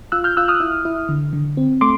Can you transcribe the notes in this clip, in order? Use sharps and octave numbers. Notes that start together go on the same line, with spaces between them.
F4 E6 F#6
F6 G6
F4 E6 F#6
D#6 F6
E4
E4
D3
D3
C4
A3 C6 D6